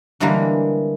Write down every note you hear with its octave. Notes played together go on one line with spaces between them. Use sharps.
D3 E3 G3 G#3 A#3